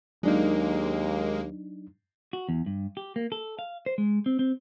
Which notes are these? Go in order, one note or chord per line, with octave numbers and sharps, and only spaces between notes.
D#2 F#3 G#3 A#3 D4 D#4
F#4
E2
G2
G4
A#3
A4
F5
C5
G#3
C4
C4